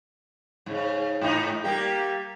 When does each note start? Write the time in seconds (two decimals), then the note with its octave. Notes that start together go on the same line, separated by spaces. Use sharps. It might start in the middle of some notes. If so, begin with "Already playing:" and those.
0.66 G#2 C#3
1.21 G#2 D#4
1.64 G3 A#3 G4